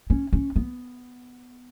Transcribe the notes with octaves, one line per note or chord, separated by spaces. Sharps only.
C#4
C#4
B3